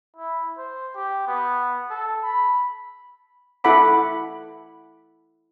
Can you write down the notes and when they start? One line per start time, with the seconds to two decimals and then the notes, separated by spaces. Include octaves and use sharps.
0.16 E4
0.57 C5
0.95 G4
1.27 B3
1.90 A4
2.23 B5
3.64 E4 A4 F#5 B5 D6